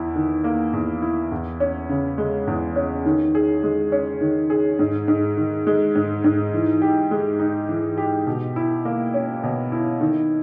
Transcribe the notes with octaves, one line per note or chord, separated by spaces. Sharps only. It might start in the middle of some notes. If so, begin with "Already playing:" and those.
Already playing: E2 E4
D#3
A#3
E2
E4
E2
C#4
C#3
G#3
E2
C#4
D#3
G#4
G#3
C#4
D#3
G#4
G#2
G#2
D#3
G#3
G#2
G#2
E3
G4
G#3
D#4
E3
G4
B2
E4
A#3
C#4
B2
E4
D#3